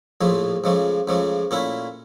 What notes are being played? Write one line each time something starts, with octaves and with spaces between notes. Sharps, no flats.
A#1 A2 F3 A3
C#2 C#3 F3 A3
C#2 C#3 F3 A3
A#2 A3 C#4 E4